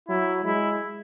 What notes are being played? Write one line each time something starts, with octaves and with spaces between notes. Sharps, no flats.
F#3 E4
G#3 E4